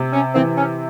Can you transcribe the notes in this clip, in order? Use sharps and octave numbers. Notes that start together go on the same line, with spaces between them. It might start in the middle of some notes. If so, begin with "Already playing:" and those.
Already playing: C3
C#4
E3 C4
C#4